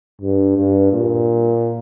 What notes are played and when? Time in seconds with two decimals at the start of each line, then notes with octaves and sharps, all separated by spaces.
0.21 G2
0.57 G2
0.92 A#2